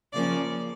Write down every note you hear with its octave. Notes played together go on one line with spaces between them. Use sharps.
C#3 F3 A#3 C#4 D5